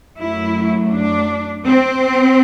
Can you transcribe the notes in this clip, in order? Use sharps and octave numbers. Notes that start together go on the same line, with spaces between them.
F#2 F#3 A3 E4
D4
C4